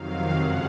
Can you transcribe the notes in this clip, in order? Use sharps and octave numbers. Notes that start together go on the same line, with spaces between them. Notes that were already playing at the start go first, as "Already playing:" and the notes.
Already playing: F2 C3 D#3 F#3 F5
F#2 C#3 G#3 F#5